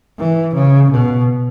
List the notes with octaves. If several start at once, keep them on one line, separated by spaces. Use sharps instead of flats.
E3
C#3
B2